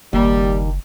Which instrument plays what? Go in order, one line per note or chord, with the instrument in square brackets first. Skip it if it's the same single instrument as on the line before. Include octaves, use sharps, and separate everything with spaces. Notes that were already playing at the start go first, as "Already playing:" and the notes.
[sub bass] F#1 [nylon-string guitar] D#2 [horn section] G3